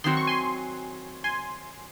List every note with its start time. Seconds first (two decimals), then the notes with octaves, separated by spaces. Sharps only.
0.04 D#3 F#3 C4 F#4 C6
0.17 C#6
0.27 G#5 C6
1.24 G#5 C6